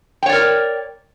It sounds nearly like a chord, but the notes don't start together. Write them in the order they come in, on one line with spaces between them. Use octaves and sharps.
G5 C#5 D5 A#4